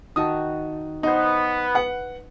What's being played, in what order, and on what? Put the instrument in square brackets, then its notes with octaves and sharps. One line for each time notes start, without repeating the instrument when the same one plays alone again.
[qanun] D#3 F#4 [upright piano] A5 D#6
[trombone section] B3 [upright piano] D#4 C5
[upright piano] B4 F#5